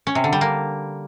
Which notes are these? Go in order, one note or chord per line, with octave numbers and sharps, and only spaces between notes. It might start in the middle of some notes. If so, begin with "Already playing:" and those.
C#4
C3
D3
G3
A#3